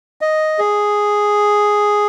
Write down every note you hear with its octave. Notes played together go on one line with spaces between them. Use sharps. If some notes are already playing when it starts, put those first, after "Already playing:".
D#5
G#4